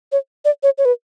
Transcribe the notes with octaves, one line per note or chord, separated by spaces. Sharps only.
C#5
D5
C#5
C#5
B4